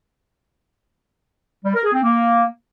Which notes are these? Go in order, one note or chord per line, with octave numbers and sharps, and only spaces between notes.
G3
A#4
G#4
C4
A#3